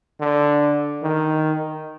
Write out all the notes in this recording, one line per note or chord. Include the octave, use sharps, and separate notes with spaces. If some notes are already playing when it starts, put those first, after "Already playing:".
D3
D#3